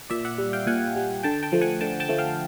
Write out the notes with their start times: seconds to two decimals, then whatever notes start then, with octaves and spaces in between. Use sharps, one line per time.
0.10 A#2 D5 E5
0.25 E5 F#5
0.38 G3
0.53 F5 G5
0.67 A#2 F#5 G#5
0.96 G3
1.23 D3 G5 A5
1.43 G5 A5
1.52 F3 A3
1.61 F#5 G#5
1.81 D3 G5 A5
2.00 G5 A5
2.09 F3 A3
2.18 F5 G5